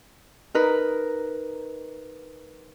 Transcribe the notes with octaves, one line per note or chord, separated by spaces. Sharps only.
D#4 A#4 B4